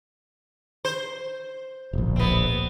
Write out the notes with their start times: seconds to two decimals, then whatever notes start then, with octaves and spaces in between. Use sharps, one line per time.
0.85 C5
1.93 D1 A#1
2.16 B3 C4